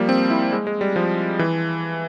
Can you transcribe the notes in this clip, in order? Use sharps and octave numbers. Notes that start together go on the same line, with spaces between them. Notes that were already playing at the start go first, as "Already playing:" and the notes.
Already playing: F3 G3 A#3
C4
E4
G#3
G#3
G3
F3
E3